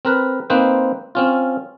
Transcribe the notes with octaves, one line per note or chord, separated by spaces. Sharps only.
C4 A#4 B4
A#3 C4 D#4 B4 C5
C4 C#4 F4